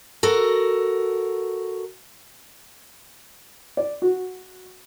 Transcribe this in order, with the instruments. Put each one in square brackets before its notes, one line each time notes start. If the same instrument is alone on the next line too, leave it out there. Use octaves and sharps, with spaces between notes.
[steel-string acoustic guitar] F#4 A4 A#4
[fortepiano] D5
F#4